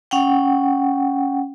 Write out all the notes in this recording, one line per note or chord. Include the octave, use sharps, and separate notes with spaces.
C#4 F#5 G5